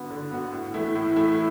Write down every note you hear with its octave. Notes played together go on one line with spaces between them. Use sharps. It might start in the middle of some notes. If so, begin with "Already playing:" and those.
Already playing: D3 B3 F#4
D3
B3 F#4
A2
E3 A3 E4
A2
E3 A3 E4